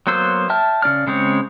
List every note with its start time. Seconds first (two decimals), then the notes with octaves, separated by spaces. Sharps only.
0.07 F#3 A#3 B3 C5 E6
0.50 E5 G5 A5 F6
0.82 C#3 D4 D5 F6
1.07 C#3 G#3 C4 C#5